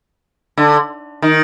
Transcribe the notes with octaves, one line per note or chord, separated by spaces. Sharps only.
D3
D#3